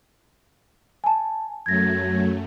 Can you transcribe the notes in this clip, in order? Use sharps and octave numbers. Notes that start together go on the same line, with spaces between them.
G#5 A5
F#2 F#3 A3 G#6 A#6